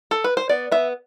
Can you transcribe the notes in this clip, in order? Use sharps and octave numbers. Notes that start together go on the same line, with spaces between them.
A4
B4
C5
B3 D5
B3 E5